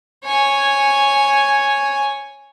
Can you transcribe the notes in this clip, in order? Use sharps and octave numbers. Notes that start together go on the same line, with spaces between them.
C#5 G#5